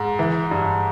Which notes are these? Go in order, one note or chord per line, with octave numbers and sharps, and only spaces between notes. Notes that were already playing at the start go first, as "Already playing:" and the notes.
Already playing: G#2
E3
G2